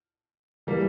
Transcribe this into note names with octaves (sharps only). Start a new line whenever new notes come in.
E3 G3 A#3